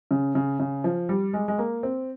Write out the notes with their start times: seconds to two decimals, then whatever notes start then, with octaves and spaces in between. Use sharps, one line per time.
0.11 C#3
0.35 C#3
0.60 C#3
0.84 F3
1.09 G3
1.33 G#3
1.48 G#3
1.58 A#3
1.83 C4